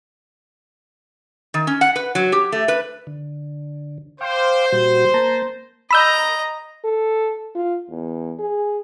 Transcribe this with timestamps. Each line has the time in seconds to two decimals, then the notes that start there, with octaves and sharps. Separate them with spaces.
1.54 D#3
1.67 C#4
1.81 F#5
1.96 B4
2.15 F#3
2.32 G4
2.52 A3
2.68 B4
3.07 D3
4.21 C5 F5 G5 D6
4.72 A#2 G3 F#4
5.14 A#3 A5 A#5
5.91 D#5 A#5 B5 E6 G6
6.84 A4
7.55 F4
7.90 E2
8.39 G#4